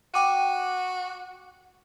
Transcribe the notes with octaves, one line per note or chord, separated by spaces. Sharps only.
F#4 G5 D6 D#7